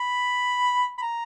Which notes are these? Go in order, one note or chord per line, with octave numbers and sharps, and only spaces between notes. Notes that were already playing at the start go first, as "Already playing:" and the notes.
Already playing: B5
B5
A#5